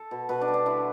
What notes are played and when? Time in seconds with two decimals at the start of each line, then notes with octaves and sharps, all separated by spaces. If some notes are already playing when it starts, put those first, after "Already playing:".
Already playing: A4
0.11 B2
0.29 B2 B4
0.41 D4
0.48 G3
0.54 D4
0.66 D3 E4